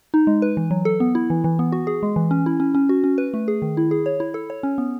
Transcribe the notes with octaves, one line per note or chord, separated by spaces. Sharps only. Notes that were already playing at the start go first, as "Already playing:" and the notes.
D#4
G#3
B4
E3
F#3
A4
B3
E4
E3
E3
B3
F#4
G#4
G#3
E3
C#4
E4
C#4
C#4
F#4
C#4
B4
A3
G#4
D#3
E4
G#4
C#5
E4
A4
C#5
C#4
B3